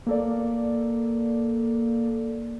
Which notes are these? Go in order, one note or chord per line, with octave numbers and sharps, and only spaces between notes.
A#3 A4 D5